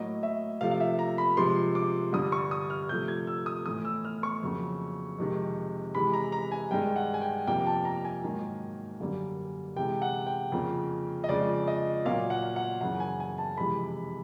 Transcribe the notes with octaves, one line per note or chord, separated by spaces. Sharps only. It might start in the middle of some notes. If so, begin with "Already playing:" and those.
Already playing: A2 F#3 A#3 D#5
E5
C3 F3 A3 F5
F5
E5
A#5
B5
C3 F3 G#3 C6
D6
G2 D3 G3 D#6
C#6
D#6
F6
C3 F3 A3 G6
G#6
E6
D#6
A2 E3 A3 D#6
E6
F6
C#6
F2 C#3 F#3 A#3
F2 C3 D#3 G#3
C3 E3 G#3 B5
A#5
A#5
G#5
G2 D#3 G#3 G5
F#5
G#5
G5
F2 C3 F3 A#3 G5
A5
A#5
G#5
G#2 D#3 F#3 A#3
F#2 D3 G3 A#3
C3 E3 G#3 G5
F#5
G5
F2 C#3 F3 A#3
D#5
F2 C#3 F3 G#3 D5
D#5
A#2 F#3 A#3 F5
F#5
F#5
F#2 C#3 E3 F#5
G#5
G#5
A5
F2 C3 E3 G#3 B5